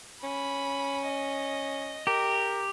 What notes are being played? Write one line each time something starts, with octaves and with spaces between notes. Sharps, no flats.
C#4 B5
D#5
G4 A#4